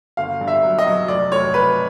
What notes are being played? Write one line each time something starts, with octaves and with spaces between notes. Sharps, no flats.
G1 F5
G2
E5
F#3
D#5
F#3
F1 D5
F1 C#5
F1 B4